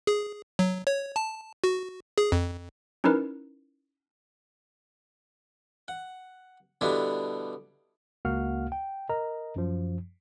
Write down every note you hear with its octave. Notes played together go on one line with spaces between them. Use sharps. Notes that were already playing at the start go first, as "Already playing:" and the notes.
G#4
F#3
C#5
A5
F#4
G#4
F2
C#4 D#4 E4 A#4 B4
F#5
B2 D3 G3 B3 D4 E4
C#2 A#3 F#4 F5 F#5 F6
G5
A#4 D#5 A#5
F#2 F3